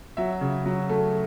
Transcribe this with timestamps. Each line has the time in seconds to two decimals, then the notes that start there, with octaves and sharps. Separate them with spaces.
0.17 F#3 E5
0.41 C#3
0.66 F#3
0.89 A3